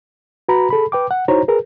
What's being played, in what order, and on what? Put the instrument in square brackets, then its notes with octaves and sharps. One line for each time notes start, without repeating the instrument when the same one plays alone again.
[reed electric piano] F#4 B4 A#5 B5
G#4 A4 B5
B4 G5 D6
F#5
D#4 E4 F#4 C5 C#5 A#5
G#4 A#4 B4